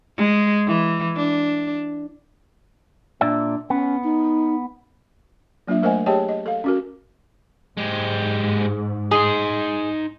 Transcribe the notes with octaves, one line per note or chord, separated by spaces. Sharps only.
G#3
E3
D4
A#2 D4 D5 E5
B3 C#4
D#4
F#3 A#3 D4 F4 E5
A3 A#4 C5 D#5 F#5 G#5
G4 G#4 C#5 D#5 G5 A5
D#5
A4 F5
C#4 F#4 A#4
G#2 G#3 G4
D#4 G#4 C6